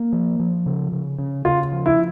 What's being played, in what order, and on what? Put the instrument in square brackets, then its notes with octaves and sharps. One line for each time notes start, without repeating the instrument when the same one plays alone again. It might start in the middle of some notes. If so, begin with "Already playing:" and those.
Already playing: [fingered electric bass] A#3
F3
F3
C#3
C#3
C#3
[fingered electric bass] C#3 [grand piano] F4
[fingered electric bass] F3
[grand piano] E4